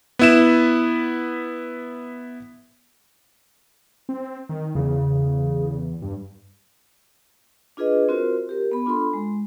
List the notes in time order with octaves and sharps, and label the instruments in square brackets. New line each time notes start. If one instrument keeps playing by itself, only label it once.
[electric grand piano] B3 E4 E7
[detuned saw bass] C4
D#3
[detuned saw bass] E2 [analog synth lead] C#3
[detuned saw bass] G2
[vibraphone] D4 F4 G#4 B4 D#5
C4 F4 F#4 A#4 C5
G4 A#4
B3 B5
D4 F4 A4 B5 C6
G#3